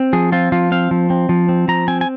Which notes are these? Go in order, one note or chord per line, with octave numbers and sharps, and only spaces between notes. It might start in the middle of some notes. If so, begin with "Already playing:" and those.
Already playing: C4
F3 G#4
C4 F4
F3 F4
C4 F5
F3
C4
F3
C4
F3 A#5
C4 G#5
G#5